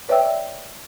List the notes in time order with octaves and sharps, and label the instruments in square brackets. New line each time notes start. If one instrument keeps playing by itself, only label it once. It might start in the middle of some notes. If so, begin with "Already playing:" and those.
[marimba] B4 C#5 D5 E5 G5 E6